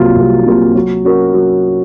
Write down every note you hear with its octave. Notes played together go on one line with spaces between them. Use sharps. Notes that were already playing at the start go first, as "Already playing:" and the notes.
Already playing: C2 C3 F#3 A#3 F4
C2
C3 F#3 A#3 F4
F#3
C#4 F#4 A#4 C#5
F#3